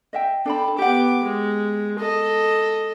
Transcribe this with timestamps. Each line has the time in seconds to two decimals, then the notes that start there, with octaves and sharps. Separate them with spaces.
0.13 D#5 E5 G5
0.46 D4 A4 G5 B5
0.78 B3 G4 F#5 D6
1.23 G#3
1.99 A4 D#5